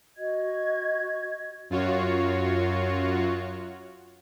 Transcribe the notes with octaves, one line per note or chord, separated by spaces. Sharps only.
F#4 D#5 G#6
F#2 F4 F#4 C#5